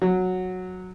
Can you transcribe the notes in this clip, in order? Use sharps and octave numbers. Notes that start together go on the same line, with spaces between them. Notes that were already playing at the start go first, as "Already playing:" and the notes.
F#3